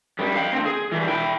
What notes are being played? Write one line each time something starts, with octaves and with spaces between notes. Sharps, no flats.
F#2 G3
F5 G5
D2 C4
G#4
E3 G3
E4 G5